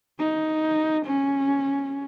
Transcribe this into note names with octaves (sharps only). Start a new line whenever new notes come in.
D#4
C#4